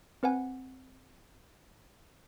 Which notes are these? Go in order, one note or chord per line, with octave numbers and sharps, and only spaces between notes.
C4 B4 F#5 G#5